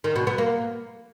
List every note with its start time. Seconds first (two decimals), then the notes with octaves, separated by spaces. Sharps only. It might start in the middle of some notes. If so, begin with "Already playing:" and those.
0.04 D#3
0.16 B2
0.27 B3
0.38 A#3